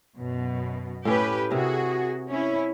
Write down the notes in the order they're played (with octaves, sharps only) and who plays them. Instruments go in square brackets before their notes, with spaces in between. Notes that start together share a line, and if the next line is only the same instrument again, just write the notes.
[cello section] F#2 B2
[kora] A2 C#4 [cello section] G4 B4
[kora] C3 A#4 [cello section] F#4 G#4
[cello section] C#4 E4